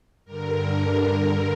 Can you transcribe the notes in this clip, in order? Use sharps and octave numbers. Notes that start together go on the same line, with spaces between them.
G2 D3 A#4